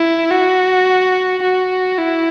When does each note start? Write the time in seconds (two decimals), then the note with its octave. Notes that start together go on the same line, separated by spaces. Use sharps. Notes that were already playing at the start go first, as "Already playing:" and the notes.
Already playing: E4
0.31 F#4
1.42 F#4
1.98 E4